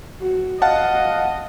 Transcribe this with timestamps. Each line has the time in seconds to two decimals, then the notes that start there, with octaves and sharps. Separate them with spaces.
0.21 F#4
0.62 D#5 F5 F#5 A5